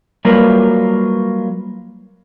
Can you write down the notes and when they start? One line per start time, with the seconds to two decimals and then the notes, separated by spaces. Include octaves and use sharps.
0.25 F#3 G3 A#3 F4 A#4 B4